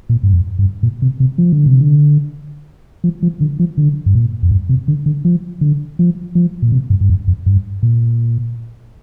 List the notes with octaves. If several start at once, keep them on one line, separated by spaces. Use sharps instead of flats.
A#2
G2
F2
G2
A#2
C3
C3
F3
D3
C3
D3
F3
F3
D3
F3
D3
G2
A#2
F2
G2
C3
D3
D3
F3
D3
F3
F3
A#2
C3
G2
G2
F2
F2
G2
A#2